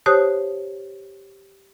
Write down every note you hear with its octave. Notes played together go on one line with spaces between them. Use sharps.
G4 C5 C#5 A5 D#6 F#6